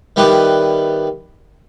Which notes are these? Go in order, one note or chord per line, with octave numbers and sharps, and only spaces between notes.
D#3 G3 B3 E4 G4 B4